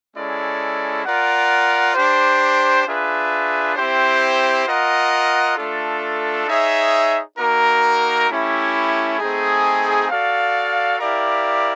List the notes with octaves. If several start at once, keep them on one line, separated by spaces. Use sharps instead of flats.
G#3 C#4 E4 A4 D5
F4 A#4 D5 F#5
D4 G4 C5
D4 F4 G#4 B4 E5
C4 E4 G4 C5
F4 A#4 D#5 F#5
A3 D4 F4 A4
D#4 G#4 C#5 E5
A#3 D#4 F#4 A#4
A3 C#4 E4 G4
A3 C4 D#4 G#4
F#4 A4 D5 F5
E4 G4 A#4 D5 F5